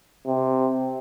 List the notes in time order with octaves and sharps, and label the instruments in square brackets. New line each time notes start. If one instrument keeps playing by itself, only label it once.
[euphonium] C3